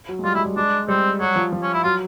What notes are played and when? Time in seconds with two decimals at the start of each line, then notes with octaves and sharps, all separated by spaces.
0.09 F#3
0.19 G#3
0.24 G3 F4
0.34 G#3 E4
0.46 G3
0.57 G#3 D4
0.88 G3 C4
1.20 F#3 G3
1.36 F3
1.52 F3
1.63 C#4
1.73 E4
1.83 F#3 F4